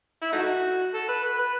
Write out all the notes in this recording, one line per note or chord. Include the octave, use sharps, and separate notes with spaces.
E4
A3 D#4 F#4
A4
B4
B4
B4